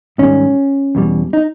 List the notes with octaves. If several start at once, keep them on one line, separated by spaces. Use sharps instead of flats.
G#2 D#3 G3 C#4
E2 B2 G3
D#4